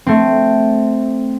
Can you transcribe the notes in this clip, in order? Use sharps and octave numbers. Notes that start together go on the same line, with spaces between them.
A3 C4